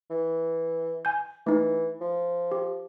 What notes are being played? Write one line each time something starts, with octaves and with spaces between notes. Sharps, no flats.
E3
G#5 G6
E3 A3 D#4
F3
G4